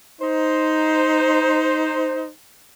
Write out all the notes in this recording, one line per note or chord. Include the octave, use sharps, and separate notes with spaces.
D#4 C5